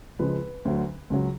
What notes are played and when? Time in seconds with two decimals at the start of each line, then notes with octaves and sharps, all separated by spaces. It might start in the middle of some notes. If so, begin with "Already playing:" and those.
0.19 C#2 C#3 F3 G#3 B4
0.65 D2 D3 F#3
1.10 C#2 C#3 F#3